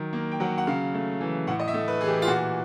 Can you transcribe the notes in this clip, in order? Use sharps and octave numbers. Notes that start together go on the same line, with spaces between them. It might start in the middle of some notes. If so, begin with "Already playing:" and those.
Already playing: D#3 F#3
A#3
G5
F#3 F#5
F#5
C#3 F5
A3
E3
A2 F#5
D#5
E5
A3
B4
E3 G#4
G4
F4
A#2 F#4